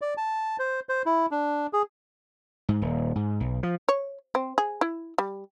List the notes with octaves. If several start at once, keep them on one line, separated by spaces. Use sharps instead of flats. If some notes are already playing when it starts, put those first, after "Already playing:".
D5
A5
C5
C5
E4
D4
G#4
G#2
D#1
G#2
B1
F3
C#5
C4
G#4
E4
G3